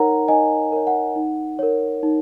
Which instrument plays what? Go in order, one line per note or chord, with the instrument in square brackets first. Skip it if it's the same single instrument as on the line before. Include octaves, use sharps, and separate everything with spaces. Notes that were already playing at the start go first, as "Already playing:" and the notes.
Already playing: [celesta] D#4 A#4 C#5 F#5 A#5
D#4 D#5 G#5
A#4 C#5
F#5
D#4
A#4 C#5
D#4